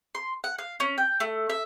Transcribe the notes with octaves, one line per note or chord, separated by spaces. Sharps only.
C6
F#5
F5
C#4
G5
A3
E5